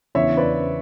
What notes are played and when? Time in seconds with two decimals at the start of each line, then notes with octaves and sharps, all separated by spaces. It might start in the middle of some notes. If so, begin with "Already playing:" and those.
0.15 E2 C#3 E3 B3 D4 C#5 E5
0.37 B4 D5